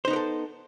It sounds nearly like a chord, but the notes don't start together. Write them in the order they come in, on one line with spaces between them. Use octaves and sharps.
C5 D#4 B3 A#4 A4